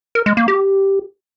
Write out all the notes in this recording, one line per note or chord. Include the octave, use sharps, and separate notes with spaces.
A#4
G#3
A#3
G4